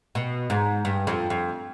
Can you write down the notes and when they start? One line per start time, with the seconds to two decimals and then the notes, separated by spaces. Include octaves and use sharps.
0.15 B2
0.50 G#2
0.85 G2
1.07 F2
1.30 F2